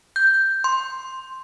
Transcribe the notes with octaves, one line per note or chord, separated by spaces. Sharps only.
G6
C6